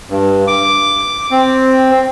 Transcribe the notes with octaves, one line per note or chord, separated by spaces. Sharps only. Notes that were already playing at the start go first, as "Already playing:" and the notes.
G2
D6
C4